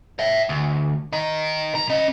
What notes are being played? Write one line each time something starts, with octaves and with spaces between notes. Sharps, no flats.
C#5 E5
D2
D#4 A#4
B1 A#5
C#4 D#5